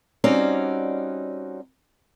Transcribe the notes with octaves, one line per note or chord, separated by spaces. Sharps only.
G3 C4 C#4 D#4 F#4 D5